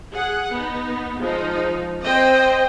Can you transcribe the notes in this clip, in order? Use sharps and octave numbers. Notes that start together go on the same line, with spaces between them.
G#4 F#5
B3 D#4
F3 G#3 D#4
C4 C5 D#5 G5